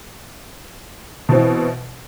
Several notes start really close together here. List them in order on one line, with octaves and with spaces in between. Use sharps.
B2 C4 E3